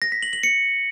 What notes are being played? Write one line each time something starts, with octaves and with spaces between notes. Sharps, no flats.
A#6
B6
F#7
F#7
C#7